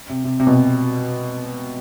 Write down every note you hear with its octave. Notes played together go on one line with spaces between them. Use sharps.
C3
C3
C3
B2
C3